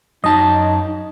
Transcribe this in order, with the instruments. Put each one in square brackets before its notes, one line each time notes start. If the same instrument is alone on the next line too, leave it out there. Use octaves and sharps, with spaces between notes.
[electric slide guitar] F#2 A5 [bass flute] D#4 [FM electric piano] D#5